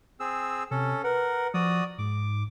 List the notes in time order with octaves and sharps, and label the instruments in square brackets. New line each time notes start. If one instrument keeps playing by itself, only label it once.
[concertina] C4 G#4 E6
[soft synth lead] C3 [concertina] C#4 A4
[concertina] A#4 F#5 [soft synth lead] B4
[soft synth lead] F3 [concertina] F#4 D5 D#6
[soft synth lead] G#2 [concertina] D6